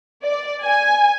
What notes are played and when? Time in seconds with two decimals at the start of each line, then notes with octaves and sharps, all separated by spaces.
0.24 D5
0.63 G#5